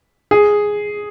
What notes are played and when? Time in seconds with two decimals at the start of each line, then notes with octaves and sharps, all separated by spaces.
0.31 G#4